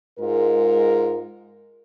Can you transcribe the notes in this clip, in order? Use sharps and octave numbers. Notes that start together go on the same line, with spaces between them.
G#2 G#3 F4 A#4